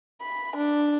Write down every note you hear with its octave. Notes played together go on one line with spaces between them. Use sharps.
B5
D4